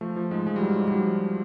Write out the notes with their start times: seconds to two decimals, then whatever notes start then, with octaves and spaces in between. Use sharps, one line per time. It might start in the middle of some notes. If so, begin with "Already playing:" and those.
0.01 F3 A3
0.16 F3
0.31 G#2 G#3
0.47 F3 G#3
0.56 G3
0.62 G#2 F#3
0.77 G#2
0.88 G3
0.91 F3 F#3
1.07 F3